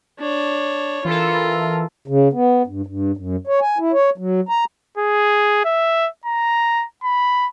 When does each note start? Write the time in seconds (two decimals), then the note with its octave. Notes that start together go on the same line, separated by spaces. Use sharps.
0.20 D4 C#5
1.05 E3 F4 A4 A#4
2.08 C#3
2.33 B3
2.67 G2
2.87 G2
3.17 F#2
3.47 C#5
3.61 G#5
3.78 E4
3.93 C#5
4.18 F#3
4.49 A#5
4.97 G#4
5.65 E5
6.26 A#5
7.04 B5